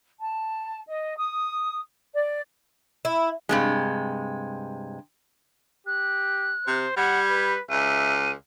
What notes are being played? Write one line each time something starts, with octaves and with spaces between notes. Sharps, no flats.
A5
D#5
D#6
D5
E4
G2 C3 G#3
G4 F#6
C3 C5
G3 F#5 G#6
B4
C#2 E5 D#7